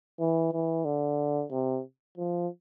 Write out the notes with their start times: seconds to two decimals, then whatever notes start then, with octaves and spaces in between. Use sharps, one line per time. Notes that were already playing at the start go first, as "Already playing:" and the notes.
0.20 E3
0.53 E3
0.85 D3
1.51 C3
2.18 F3